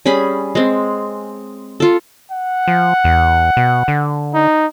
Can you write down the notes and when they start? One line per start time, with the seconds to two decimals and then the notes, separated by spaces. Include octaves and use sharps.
0.06 G3 C#4 G#4 B5
0.55 G#3 C4
1.80 F4 A4
2.31 F#5
2.68 F3
3.04 E2
3.57 B2
3.88 D3
4.34 D#4